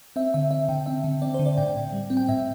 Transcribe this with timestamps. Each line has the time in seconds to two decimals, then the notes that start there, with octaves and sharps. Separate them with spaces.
0.16 C4 E5
0.34 D3 E5
0.51 C4 E5
0.68 D3 G5
0.86 C4 E5
1.04 D3
1.22 C4 D5
1.34 D3 C5
1.46 D5
1.57 A2 G5
1.76 A2
1.93 G3
2.10 C4
2.17 G5
2.29 A2 E5